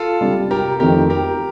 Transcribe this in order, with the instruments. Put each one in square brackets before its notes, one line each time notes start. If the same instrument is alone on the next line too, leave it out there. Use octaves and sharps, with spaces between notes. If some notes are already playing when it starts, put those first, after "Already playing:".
Already playing: [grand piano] F4 A4
[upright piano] C3 G3 D4
[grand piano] G4 A#4
[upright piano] F2 D#3 A3 C4 [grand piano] G4 A#4
[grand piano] G4 A#4